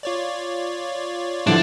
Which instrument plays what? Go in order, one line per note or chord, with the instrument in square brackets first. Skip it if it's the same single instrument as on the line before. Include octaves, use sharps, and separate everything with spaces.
[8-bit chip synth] F4 C#5 D5
[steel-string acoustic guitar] D3 F3 E4 [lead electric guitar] D4 [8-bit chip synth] C5 F#5